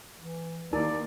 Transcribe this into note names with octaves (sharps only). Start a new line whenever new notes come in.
E3
D#2 D#4 E4 A#4 D5